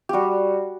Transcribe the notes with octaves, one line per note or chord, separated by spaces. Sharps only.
G3 F#4 G4